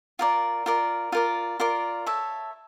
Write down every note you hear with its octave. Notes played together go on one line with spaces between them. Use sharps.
F4 A#4 D5
F4 A#4 D5
F4 A#4 D5
F4 A#4 D5
A4 C#5 E5